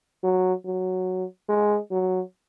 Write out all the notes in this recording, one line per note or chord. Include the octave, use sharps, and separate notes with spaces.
F#3
F#3
G#3
F#3